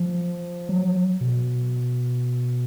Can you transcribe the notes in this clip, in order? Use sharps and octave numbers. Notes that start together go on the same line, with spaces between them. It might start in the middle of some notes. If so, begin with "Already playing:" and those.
Already playing: F3
F#3
B2